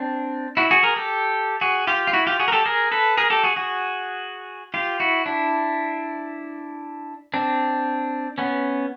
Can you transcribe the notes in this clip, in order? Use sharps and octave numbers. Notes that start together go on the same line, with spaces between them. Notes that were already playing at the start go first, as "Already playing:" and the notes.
Already playing: C4 D4
E4 F#4
F#4 G#4
G#4 A#4
G4 A4
F#4 G#4
F4 G4
F4
E4 F#4
F4 G4
F#4 G#4
A#4
G4 A4
G#4 A#4
A4 B4
G#4 A#4
G4 A4
F#4 G#4
F#4 G#4
F4 G4
E4 F#4
D4 E4
C4 D4
B3 C#4